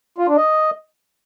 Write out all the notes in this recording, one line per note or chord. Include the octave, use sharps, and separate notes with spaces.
F4
D4
D#5